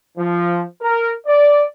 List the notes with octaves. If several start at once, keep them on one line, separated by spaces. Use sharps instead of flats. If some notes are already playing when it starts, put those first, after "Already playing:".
F3
A#4
D5